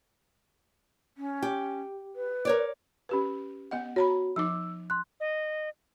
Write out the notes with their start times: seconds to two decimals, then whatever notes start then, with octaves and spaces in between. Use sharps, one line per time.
1.17 C#4
1.43 G4
2.15 B4
2.45 A#4 C#5 D5
3.09 C#4 G4 B4
3.71 B3 D#5 F#5
3.96 F#4 C#5 A#5 B5
4.36 F3 D#4 D6 E6
4.90 C6 F#6
5.20 D#5